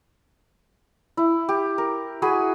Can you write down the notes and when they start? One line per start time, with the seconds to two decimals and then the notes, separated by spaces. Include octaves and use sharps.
1.17 E4
1.49 G4
1.78 A#4
2.22 F#4 G#4 G#5 B5